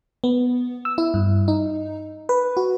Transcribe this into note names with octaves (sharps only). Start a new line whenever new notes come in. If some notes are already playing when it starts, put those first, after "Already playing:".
B3
E6
E4
G2
D#4
B4
F#4